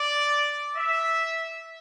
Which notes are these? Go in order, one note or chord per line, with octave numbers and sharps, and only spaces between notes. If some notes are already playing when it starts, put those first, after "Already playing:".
Already playing: D5
E5